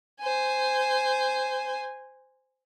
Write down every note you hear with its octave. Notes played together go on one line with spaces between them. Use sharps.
C5 G#5